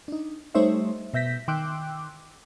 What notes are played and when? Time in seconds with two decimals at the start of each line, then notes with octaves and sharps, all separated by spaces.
0.08 D4 D#4
0.55 G3 A3 D#4 C5 C#5 E5
1.14 B2 E5 G6 A#6 B6
1.48 D#3 G5 C6 D6 E6 F#6